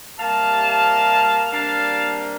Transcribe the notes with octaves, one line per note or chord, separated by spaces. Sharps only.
C3 G3 A#3 F5 A5
C3 G3 A#3 D4 F5 A5